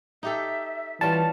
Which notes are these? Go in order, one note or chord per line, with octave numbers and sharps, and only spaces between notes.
D#4 G4 A4 E5
E3 G3 C#4 F4 A5